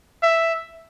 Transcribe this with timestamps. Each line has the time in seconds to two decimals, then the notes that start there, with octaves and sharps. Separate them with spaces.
0.23 E5